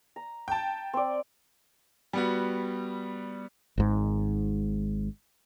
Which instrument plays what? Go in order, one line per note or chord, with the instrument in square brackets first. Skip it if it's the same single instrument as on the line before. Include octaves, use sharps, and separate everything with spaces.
[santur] A#5
[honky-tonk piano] G5 A5
[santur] C4 D5
[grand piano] G3 B3 F#4
[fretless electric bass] G#1 G#2